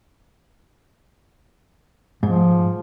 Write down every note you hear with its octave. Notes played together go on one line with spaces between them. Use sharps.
G#2 F3